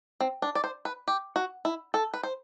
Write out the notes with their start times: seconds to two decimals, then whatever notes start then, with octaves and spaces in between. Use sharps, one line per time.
0.20 C4
0.42 D4
0.55 D5
0.64 C5
0.85 B4
1.08 G4
1.36 F#4
1.65 E4
1.94 A4
2.14 B4
2.23 C5